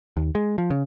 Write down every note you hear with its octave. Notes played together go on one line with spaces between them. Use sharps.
D#2
G#3
F3
C#3